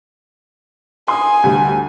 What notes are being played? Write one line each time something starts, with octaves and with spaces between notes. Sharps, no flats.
G#5 C6 D#6
D2 G3